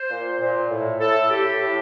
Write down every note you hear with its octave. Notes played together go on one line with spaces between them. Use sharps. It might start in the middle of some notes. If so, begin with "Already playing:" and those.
Already playing: C5
A#2
A#2
A2
A2 A4
A2 G4
A2